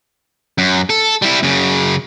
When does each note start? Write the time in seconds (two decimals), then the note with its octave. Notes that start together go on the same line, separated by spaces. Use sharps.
0.58 F#2
0.90 A4
1.22 G3 E4
1.43 F#2 C#3